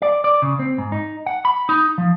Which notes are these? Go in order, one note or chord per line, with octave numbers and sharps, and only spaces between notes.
D5
D5
C#3
C4
G#2
D#4
F#5
B5
D#4
F3